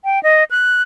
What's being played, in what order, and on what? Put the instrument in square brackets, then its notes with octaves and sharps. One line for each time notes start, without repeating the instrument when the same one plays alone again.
[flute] G5
D#5
F#6